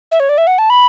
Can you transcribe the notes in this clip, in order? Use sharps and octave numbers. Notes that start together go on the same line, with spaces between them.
E5
C#5
D5
E5
F#5
A5
B5